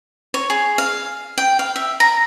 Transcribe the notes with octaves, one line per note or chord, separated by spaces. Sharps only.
C#5
G#4
F5
G5
F5
E5
A#5